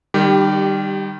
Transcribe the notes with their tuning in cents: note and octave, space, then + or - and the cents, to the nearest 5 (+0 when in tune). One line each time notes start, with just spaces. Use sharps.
D#3 -30 G3 +5 G4 -10